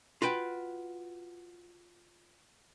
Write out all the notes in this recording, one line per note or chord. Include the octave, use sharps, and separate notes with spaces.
F4 F#4 B4 G5